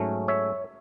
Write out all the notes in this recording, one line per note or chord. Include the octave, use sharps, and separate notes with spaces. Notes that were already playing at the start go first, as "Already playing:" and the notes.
Already playing: G#2 F#3 A3 C#4
C#5 E5